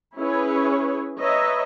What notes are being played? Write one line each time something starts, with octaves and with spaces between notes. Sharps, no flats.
C#4 E4 G#4 B4 C#5
B4 C#5 D#5 E5 A#5